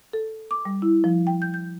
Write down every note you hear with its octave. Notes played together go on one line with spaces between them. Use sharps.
A4
D6
G3
E4
F3
G5
G6
G6